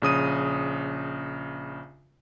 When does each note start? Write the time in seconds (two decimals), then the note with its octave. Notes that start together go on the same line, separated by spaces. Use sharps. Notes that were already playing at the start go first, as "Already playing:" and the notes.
0.02 A#1 C#3 D#6 D#7